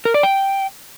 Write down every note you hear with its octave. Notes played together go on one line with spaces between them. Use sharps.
A#4
D5
G5